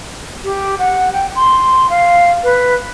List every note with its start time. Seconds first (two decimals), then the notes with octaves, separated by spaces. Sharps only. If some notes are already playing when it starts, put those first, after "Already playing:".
0.44 G4
0.79 F#5
1.13 G5
1.36 C6
1.90 F5
2.43 B4